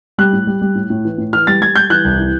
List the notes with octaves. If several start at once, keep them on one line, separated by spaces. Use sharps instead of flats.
G3 F#6
A2
G3
G3
A2
A2
E3
A2
E3 F6
G3 A6
G3 G#6
G3 G6
E3 F#6
C2
E3